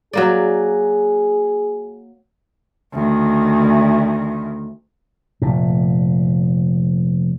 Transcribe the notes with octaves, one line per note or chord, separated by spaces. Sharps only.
F#3 A#3 G#4 D5
D2 D#3
F1 A#2